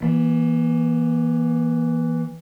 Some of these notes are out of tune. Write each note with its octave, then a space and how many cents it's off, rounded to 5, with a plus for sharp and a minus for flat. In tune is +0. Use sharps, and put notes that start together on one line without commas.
E3 +0 A#3 +35